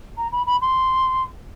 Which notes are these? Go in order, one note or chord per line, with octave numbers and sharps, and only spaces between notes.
A#5
B5
B5
C6